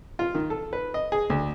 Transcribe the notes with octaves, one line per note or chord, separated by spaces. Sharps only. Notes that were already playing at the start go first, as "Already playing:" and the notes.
F4
D#3
A4
B4
D#5
G#4
D2